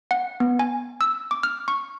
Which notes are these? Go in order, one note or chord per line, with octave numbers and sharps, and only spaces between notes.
F#5
B3
G#5
E6
D6
F6
C#6